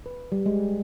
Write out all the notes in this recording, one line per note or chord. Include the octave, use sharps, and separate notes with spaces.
B4
G3
G#3